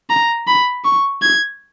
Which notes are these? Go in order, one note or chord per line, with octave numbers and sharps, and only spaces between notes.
A#5
B5
C#6
G#6